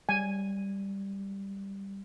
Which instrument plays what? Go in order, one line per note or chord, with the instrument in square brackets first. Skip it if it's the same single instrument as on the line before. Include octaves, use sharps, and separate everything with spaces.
[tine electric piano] G3 [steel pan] G#5